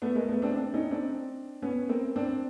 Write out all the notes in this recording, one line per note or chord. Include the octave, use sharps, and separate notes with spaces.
A3 B3
G#3 A#3
A3 B3
C4 D4
C4 D4
C#4 D#4
C4 D4
B3 C#4
A#3 C4
C4 D4